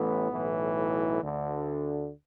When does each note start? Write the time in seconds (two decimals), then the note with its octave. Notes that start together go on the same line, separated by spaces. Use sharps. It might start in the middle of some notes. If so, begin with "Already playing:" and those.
Already playing: A1 A2 E3 B3
0.30 B1 A2 E3
1.22 D2 D3